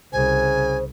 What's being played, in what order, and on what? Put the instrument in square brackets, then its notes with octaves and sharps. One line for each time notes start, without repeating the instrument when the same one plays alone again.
[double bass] C2 [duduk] C#3 [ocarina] C5 [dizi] G#5